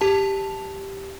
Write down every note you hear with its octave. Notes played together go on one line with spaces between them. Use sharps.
G4 A5